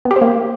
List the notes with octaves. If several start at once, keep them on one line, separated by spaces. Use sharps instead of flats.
B3
G4
C5
A#3